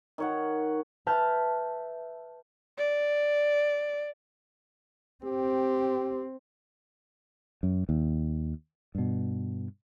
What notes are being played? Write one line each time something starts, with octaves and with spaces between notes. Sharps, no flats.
D#3 C#5 F#5
B4 E5 A5 F6 G6
D5
C4 G4
F#2
D#2
G2 B2